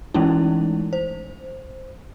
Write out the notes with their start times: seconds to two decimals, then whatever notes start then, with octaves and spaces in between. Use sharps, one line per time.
0.14 E3 G#3 A3 C#4 D#4 E4
0.93 C5